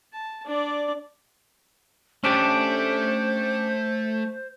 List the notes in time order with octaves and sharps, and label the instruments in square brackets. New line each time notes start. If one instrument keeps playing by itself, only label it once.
[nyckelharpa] A5
D4 D5
[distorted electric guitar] A3 A4 [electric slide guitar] C#4 D4 G4 [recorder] C5